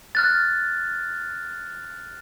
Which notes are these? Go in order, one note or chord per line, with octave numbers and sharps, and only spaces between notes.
F6 F#6 A6